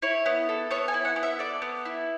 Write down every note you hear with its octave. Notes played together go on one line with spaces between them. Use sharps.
E4 C#5
B3
A4
B3 C#5
G#5
E4
F#5
B3
E5
A4 D5
B3
E4